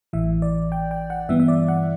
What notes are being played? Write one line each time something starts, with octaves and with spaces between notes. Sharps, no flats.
A1 A2 E3 E5
D5
G5
G5
F#5
G2 E3 B3 E5
E5
D5
F#5